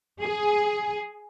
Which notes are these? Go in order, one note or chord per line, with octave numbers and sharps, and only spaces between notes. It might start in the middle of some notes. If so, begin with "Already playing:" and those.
G#4